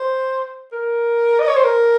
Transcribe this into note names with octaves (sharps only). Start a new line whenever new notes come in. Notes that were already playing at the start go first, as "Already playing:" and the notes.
Already playing: C5
A#4
D#5
C#5
C5
A#4